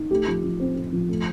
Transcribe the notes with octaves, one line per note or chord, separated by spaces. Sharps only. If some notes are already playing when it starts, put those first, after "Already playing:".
Already playing: D#4
A3 G4
F3
F3
C4
C4
F3
A3